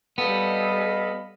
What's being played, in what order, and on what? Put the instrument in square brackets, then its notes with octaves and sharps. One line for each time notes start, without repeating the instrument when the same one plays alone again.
[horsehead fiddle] G3 A4 [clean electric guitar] B3 [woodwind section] D#5 F5 B5